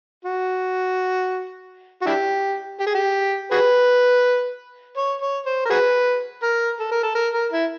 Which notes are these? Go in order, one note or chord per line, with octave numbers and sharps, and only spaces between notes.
F#4
F#4
D4 E4 G4
G4
G#4
G4
F#4 G#4 B4
C#5
C#5
C5
A#4
F#4 G#4 B4
A#4
A4
A#4
A4
A#4
A#4
E4